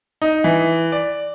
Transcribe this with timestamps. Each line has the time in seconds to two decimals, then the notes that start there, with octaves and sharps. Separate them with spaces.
0.22 D#4
0.44 E3
0.92 D5